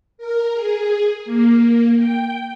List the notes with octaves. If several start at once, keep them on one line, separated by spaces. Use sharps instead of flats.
A#4
G#4
A#3
G5